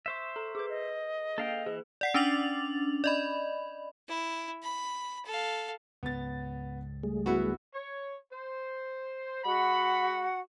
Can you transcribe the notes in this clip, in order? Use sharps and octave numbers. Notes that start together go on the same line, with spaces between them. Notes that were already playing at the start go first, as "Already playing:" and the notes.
C5 E5 C#6 E7
A4 A#5
G#4 B4 D6
D#5
A#3 A4 F5 G5
E3 G#4
D5 F#5 C7
C#4 D4 D6 A6 F7 F#7
D5 D#5 B5
E4
B5
A4 F5
C#2 G#2 B3 A6
G3 A3 G#4
B3 E4 F#4
C#5
C5
G#3 F#4 F#5 B5